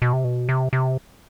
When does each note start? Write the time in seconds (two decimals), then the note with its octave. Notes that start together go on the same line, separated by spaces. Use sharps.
0.02 B2
0.13 C3
0.24 B2
0.49 C3
0.73 C3